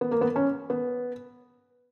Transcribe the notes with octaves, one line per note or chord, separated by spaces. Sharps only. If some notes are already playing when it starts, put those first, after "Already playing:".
B3
A#3
B3
C#4
B3